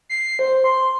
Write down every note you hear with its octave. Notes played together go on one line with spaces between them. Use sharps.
C7
C5
C6